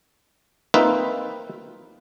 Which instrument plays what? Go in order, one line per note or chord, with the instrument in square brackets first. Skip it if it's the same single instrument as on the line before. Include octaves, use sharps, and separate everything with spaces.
[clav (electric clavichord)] A#3 C4 D#4 F4 B4 E5